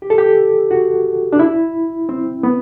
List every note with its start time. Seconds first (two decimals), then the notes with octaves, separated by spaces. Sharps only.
0.02 G4
0.10 A4
0.18 G4
0.71 F#4
1.33 D4
1.39 E4
2.09 C4
2.43 B3